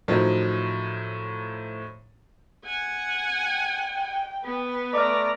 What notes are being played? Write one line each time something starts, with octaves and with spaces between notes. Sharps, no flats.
A2 D#3 F3 F#3
F#5 G#5
G5
B3 B4
A3 D5 A#5 D6 F6